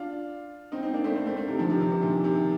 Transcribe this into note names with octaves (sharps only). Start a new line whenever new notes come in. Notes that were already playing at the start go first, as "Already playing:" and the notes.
Already playing: D4 F4
C4 D#4
C4 D#4
A#3 D4
A3 C4
A3 C4
A3 C4
A3 C4
C3 D#3
D3 F3
C3 D#3
C3 D#3
C3 D#3
A#2 D3
C3 D#3